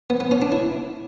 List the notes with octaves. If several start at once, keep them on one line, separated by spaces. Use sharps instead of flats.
B3
B3
C#4
D4
E4